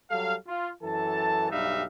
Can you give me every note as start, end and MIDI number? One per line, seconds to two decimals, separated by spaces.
0.10 0.35 54
0.10 0.35 55
0.10 0.35 69
0.10 0.35 77
0.47 0.69 65
0.83 1.50 42
0.83 1.50 52
0.83 1.50 69
0.83 1.50 81
1.51 1.84 35
1.51 1.84 43
1.51 1.84 55
1.51 1.84 63
1.51 1.84 76
1.51 1.84 77